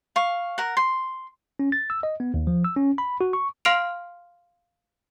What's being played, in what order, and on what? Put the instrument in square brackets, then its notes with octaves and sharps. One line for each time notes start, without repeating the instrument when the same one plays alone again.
[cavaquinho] F5 C#6
A#4 F#5
C6
[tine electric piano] C#4
A6
E6
D#5
B3
D#2
F3
E6
C#4
B5
F#4
C#6
[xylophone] F5 C6 F6 C7 D7 F7